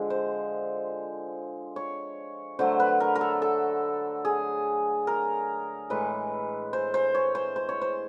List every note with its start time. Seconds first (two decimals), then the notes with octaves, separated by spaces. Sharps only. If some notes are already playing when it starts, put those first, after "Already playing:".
Already playing: D3 F3 G#3
0.10 C5
1.76 C#5
2.59 D3 F#3 A3 C5
2.80 B4
3.00 A#4
3.15 A#4
3.21 A4
3.42 A4
4.25 G#4
5.07 A#4
5.90 A2 E3 G#3 B4
6.73 C5
6.94 C5
7.15 C#5
7.35 C5
7.56 C5
7.69 C#5
7.81 C5